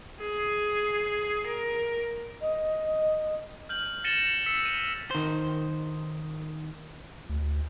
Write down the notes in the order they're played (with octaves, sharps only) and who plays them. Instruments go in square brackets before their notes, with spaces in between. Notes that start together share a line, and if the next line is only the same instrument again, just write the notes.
[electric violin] G#4
A#4
[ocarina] D#5
[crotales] F6 G6 F#7
A6 A#6 C#7 D#7 E7 G7
F7
E6 B6 C#7
D#7
[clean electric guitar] D#3 C5
[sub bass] D2